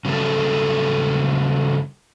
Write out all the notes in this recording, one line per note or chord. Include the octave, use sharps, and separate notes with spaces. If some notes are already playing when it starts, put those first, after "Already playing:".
C#3 F#3 G3 A3 A4